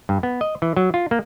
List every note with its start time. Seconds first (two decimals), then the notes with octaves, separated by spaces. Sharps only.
0.09 G2
0.23 B3
0.41 D#5
0.62 E3
0.76 F#3
0.94 F4
1.11 A#3